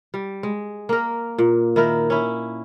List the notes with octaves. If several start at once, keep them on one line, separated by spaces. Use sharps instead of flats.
G3
G#3
A#3 A#4
A#2
D#3 E4 A#4
C#4 E4